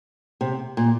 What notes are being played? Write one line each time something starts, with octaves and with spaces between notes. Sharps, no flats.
C3
A#2